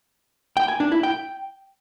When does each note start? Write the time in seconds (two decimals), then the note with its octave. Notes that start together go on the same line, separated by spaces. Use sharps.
0.57 G5
0.68 G#5
0.80 D4
0.92 E4
1.03 G5